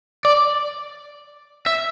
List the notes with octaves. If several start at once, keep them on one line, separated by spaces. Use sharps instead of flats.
D5
E5